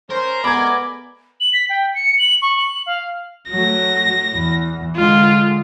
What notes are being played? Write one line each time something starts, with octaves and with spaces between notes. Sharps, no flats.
C#4 A#4 C5
G#3 A3 B3 D5 G#5 B5 D6 G#6
F#7
B6
G5
C#7
F#7
C#6
F#7
F5
F#3 A3 A#6
E2 E3
D3 G#3 F4